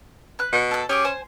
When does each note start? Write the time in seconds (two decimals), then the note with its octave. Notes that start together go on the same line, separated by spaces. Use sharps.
0.39 B4 F#6
0.53 B2
0.71 A4 F#6
0.89 C#4 G4 G#4 D6
1.05 C5 G#5